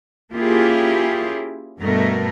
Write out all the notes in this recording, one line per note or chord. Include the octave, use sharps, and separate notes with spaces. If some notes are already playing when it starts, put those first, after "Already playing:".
A#3 C#4 E4 F4 G4 G#4
G2 B2 A3 A#4